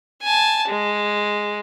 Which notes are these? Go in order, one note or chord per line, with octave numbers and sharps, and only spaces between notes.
G#5 A5
G#3